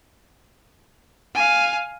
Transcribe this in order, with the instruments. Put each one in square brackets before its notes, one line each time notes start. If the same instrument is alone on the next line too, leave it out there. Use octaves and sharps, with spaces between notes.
[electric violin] F5 G#5